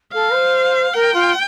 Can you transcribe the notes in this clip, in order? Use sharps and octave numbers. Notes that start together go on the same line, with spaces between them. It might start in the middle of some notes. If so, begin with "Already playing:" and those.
A4 F5
C5
A#4 G5
F4